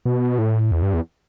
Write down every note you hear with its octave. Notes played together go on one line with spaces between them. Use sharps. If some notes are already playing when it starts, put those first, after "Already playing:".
B2
A2
E2
G2
E2